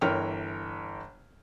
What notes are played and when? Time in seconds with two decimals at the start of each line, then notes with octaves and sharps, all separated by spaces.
0.01 G1 E3 A#4 C#5 G5 F6